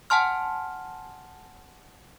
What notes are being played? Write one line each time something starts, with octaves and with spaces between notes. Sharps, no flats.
F#5 G#5 A5 C6 F6